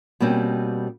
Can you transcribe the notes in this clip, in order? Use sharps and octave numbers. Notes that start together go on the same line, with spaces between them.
B2 G3 A#3 C4 C#4